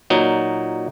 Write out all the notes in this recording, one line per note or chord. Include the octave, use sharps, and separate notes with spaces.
A#2 F#3 D#4